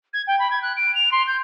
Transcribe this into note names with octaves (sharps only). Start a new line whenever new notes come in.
G#6
G5
B5
G#6
F#6
D7
F7
C6
G6